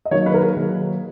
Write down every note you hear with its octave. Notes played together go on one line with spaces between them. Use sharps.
D#5
D#3 F#3 A#3 D#4 C#5
B4
A#4
G#4
D#3 F#3 A#3 D#4